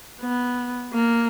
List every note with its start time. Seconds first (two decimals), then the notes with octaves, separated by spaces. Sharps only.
0.21 B3
0.93 A#3